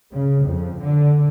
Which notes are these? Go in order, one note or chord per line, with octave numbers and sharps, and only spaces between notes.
C#3
F2
D3